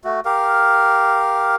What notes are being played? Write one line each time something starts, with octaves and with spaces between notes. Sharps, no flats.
A3 F#4
G4 A#4 F5